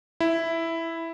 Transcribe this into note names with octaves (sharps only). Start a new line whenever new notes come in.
E4